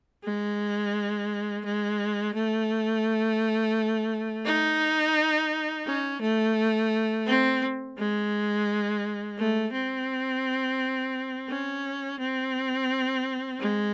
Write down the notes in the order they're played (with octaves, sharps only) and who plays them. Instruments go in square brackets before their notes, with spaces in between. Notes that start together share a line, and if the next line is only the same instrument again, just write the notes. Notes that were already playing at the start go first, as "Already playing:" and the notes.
[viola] G#3
G#3
A3
D#4
C#4
A3
C4
G#3
A3
C4
C#4
C4
G#3